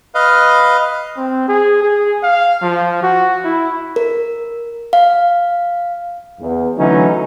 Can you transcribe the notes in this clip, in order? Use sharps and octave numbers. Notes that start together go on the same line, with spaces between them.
B4 D#5 F5
C4
G#4
G#4
F5
F3
F#4
E4
A#4
F5
E2
D3 E3 F#3 A3 C#4 D#4